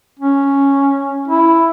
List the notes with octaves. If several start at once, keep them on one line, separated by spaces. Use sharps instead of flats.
C#4
E4